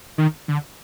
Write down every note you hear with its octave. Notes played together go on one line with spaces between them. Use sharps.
D#3
D3